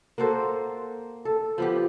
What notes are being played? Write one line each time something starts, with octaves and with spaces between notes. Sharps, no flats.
A#3 F#4 A4 C5
A4
F3 B3 G4